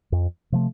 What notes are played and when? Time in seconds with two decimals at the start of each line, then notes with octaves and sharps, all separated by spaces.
0.12 F2
0.52 C3 F3 A3